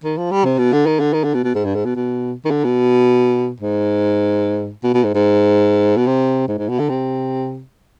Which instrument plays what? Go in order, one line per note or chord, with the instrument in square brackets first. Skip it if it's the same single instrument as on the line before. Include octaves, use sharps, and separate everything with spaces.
[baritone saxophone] D#3
F3
G3
C3
B2
D3
D#3
D3
D#3
D3
B2
B2
G#2
G2
G#2
B2
B2
D#3
D3
B2
G#2
B2
B2
G#2
G#2
B2
C3
G#2
G#2
B2
D3
C3